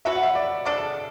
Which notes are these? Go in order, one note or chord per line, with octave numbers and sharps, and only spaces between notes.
F#3 C#4 F#4 B4 E5
F#5
E5
D5
C#3 G#3 D4 A4 D5